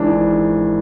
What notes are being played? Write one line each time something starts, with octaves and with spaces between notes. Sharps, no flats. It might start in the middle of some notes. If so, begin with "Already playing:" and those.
Already playing: G#1 G#2 E3 D4